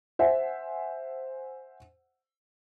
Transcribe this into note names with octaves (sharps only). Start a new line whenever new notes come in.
C5 E5 F#5 G#5